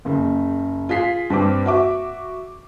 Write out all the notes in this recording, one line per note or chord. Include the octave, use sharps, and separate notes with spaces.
F#1 C#3
F4 G#4 B6 C7
G2 C4 D6
F#4 E5 D6